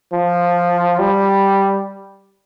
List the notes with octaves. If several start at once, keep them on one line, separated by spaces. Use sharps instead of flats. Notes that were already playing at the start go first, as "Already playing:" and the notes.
F3
G3